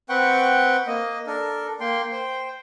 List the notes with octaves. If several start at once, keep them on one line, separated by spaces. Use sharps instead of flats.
C4 B4 F#5 G5 C#6
A#3 D#5
D4 A4 A#4
A#3 G5 C6
C5 G5